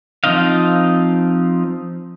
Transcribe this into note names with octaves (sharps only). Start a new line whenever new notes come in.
F3 C4 D#4 D#5 F5